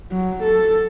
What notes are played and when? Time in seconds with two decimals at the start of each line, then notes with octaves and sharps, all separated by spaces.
0.12 F#3
0.42 A4